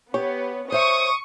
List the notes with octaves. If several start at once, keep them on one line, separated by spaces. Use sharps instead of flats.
B3 G4 C#5
C5 E5 C#6 D#6